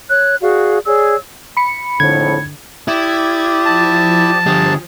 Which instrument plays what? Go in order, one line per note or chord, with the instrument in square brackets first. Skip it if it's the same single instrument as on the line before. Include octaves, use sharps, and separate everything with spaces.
[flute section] C#5 F#6
F#4 G#4 D5 F5
G#4 C#5 D5 E6
[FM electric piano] B5 C#7
[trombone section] G#1 F2 A2 [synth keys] D3 [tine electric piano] G#6
[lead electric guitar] E4 [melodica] G4 D5 D#6 [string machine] G#6
[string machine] F3 [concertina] A5
[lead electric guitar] D3 G4 [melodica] G#4